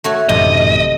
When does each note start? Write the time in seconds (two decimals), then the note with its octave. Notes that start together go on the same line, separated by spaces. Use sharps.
0.04 A3 F#4 C#5
0.29 A1 F#2 C3 D#3 D#5